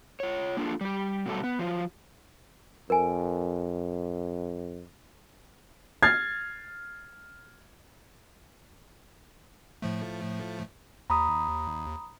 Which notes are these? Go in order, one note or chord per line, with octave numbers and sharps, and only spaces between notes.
F4 C#5
A#3 D4 F4 A4
G3 G4
B2 F#3 G3 A3 A4
B3
F3 F#3 F4
F2 A#4 G#5
F6 G#6 A6 C7
A2 F3 A3
D#2 A#5 B5 D#6